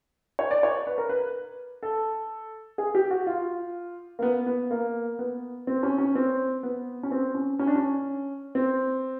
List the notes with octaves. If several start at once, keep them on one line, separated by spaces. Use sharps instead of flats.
C#5
D5
C#5
B4
A#4
B4
A4
G#4
G4
F#4
F4
A#3
B3
B3
A#3
B3
C4
C#4
C#4
C4
B3
C#4
C4
C#4
C#4
D4
C#4
C4